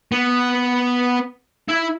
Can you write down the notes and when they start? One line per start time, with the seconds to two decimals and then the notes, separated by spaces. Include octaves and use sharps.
0.12 B3
1.68 E4